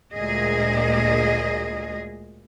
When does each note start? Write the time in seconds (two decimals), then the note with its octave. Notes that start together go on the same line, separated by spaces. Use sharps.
0.13 D2 A#2 G#3 G#4 D#5